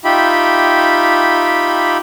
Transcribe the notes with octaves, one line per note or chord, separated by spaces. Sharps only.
D#4 F4 G4 E5 G5 B5